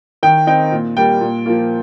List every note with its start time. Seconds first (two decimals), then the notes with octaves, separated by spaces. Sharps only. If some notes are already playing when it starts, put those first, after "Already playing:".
0.23 D#3 G5
0.47 C4 D#4 G5
0.72 A#2
0.97 G3 A#3 G5
1.21 A#2
1.46 F3 A#3 F4